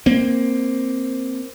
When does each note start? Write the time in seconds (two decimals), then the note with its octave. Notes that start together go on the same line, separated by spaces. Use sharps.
0.06 A#3 C4